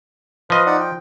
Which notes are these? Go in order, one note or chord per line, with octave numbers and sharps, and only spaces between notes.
F3 B4 D#5
D#4 D5 F#5
G5